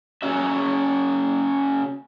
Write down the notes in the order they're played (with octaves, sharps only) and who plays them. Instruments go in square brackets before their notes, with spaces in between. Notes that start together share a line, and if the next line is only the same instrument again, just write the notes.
[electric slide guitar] C#3 C#4 F#4 E5